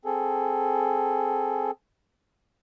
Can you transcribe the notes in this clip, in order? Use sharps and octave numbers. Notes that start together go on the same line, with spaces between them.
C4 G#4 A4